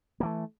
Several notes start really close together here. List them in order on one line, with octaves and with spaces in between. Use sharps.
A#3 E3 A3